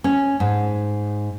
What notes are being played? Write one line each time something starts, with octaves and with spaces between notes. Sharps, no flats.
C#4
G#2